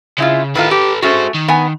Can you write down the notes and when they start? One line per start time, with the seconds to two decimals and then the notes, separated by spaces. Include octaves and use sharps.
0.18 C#3 G#3 E4 F4
0.55 A2 D#3 F4 A4 B4
0.71 G4
1.02 G#3 A3 C#4 F#4 C5
1.34 D#3
1.48 B3 G#5